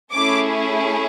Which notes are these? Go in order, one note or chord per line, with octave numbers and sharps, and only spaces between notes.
A3 C#4 E4 G#4 D6